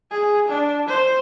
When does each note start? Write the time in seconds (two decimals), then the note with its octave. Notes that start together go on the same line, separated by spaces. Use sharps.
0.11 G#4
0.48 D4
0.88 C5